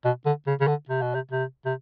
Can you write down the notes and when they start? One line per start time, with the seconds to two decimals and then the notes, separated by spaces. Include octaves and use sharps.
0.05 B2
0.26 D3
0.47 C#3
0.61 C#3
0.68 D3
0.89 C3
1.02 B2
1.14 C3
1.31 C3
1.65 C3